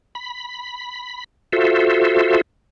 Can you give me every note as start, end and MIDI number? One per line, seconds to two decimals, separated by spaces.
0.15 1.24 83
1.53 2.41 65
1.53 2.41 66
1.53 2.41 69
1.53 2.41 72
1.53 2.41 76